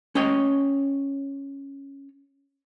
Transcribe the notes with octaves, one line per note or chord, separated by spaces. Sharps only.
C#4 C#5 D#5 G5